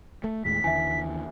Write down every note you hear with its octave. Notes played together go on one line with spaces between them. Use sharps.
A3
D#2 A2 G#3 B6
D#2 D3 E3 E5 G#5